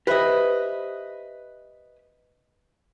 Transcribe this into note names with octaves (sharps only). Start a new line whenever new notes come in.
G4 B4 C5 D#5 E5